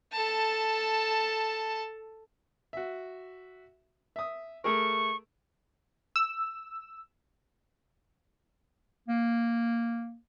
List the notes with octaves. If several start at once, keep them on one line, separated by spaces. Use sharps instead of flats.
A4 A5
F#4 E5
E5 D#6
A3 G#4 A#4 C#6
E6
A#3